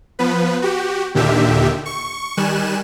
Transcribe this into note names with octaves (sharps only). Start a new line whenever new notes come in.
F3 B3 B4
F#4 G4
D#2 A#2 D3 D#3 G4 E5
C#6
D#3 G3 G#5 F#6 E7